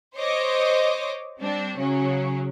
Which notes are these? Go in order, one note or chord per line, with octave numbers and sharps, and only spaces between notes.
C5 C#5 D#5 D6
G3 C4 D4
C#3 F#3 C#4